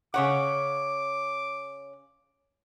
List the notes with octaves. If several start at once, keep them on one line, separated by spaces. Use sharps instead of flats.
C#3 C#5 F#5 D6